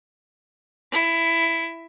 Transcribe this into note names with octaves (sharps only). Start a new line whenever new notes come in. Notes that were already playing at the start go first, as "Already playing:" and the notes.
E4